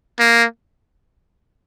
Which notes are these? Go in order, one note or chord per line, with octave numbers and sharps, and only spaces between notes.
A#3